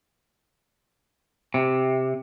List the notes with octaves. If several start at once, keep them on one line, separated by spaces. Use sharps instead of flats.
C3